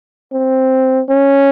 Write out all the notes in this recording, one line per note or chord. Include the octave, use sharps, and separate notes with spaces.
C4
C#4